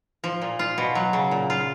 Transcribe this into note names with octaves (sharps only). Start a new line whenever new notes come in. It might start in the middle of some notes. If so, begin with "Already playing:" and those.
F3
A#2
F4
B2
F#3
C#3
A#2
F4